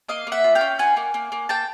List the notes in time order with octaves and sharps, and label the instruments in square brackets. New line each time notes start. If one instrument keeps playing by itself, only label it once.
[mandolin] A#3 D#5 F5
A#3
E5 F#5
F4
F5 G5
C#4
F4 F#5 G#5
A#3
A#3
A#3
A#3 G5 A5